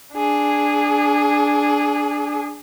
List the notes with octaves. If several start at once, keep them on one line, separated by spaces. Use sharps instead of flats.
D4 G#4